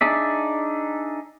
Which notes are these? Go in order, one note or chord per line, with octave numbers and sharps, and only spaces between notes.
D4 D#4 G#4 D5 E5